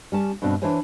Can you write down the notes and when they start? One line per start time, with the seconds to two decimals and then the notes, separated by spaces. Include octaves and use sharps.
0.12 G3 C#4 A5
0.42 G2 B2 C4 D4
0.62 E3 D4 C5 C#5 G#5